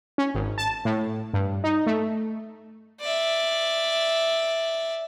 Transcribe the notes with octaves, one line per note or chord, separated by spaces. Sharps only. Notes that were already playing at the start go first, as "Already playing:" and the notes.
C#4
G#1
A5
A2
G2
D#4
A3
D5 E5